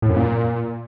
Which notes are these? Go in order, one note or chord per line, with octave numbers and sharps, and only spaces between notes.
A2
F#2
A#2